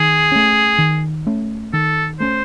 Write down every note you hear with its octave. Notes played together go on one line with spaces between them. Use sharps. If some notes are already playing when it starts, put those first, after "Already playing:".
Already playing: D#3 G#4
A3 C#4
D#3
A3 C#4
D#3 A4
A3 C#4 C5